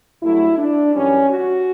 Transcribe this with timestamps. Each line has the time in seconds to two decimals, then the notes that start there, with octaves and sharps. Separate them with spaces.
0.20 G2 F#3 A3 E4
0.56 D4
0.93 F#2 E3 G3 C#4
1.28 F#4